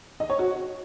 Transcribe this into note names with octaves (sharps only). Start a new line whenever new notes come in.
D#5
C#5
F#4